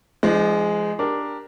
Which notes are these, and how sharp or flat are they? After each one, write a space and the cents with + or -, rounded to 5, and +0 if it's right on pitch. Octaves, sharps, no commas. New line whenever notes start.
F3 -40 G#3 +0 D4 +30
D4 +0 G4 +0 A#4 +0